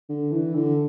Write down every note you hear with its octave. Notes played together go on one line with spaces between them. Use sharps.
D3
E3
D3